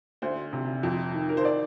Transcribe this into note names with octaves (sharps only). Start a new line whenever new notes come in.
D2 C5
C3
F2
D#3
A#4
C5
D5